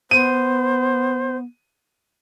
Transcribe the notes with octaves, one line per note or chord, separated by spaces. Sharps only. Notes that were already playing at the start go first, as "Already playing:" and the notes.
B3 C5 D#7